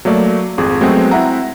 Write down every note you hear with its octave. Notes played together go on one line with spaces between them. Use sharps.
F#3 A3 A#3 D5
G#1 F2 G#4
F#3 G#3 A3 B3 C4
C4 E4 E5 F#5 A#5